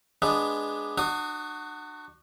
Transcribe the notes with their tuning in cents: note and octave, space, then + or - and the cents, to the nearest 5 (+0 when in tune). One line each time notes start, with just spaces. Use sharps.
G#3 +0 B3 +0 D4 +0
D4 +40 F#4 +0 D#6 +0